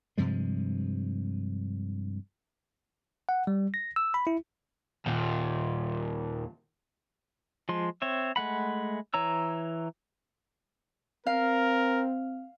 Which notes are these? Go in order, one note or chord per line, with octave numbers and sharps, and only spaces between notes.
G2 C3 F3 G#3
F#5
G3
A#6
E6
B5
E4
D#2 A#2
F3 G#3 C6
C4 C#5 E5
G#3 A3 F#5 B5
E3 C#5 A#5 E6
C4 A#4 F5